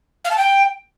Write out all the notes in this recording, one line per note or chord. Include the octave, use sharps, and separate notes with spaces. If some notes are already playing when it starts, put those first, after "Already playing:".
F5
A5
G5